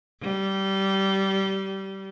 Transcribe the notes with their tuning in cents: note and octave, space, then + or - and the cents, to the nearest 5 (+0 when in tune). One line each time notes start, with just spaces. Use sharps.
G3 -20